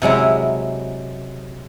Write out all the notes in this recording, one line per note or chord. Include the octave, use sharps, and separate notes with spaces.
C3 F#3 G#3 E4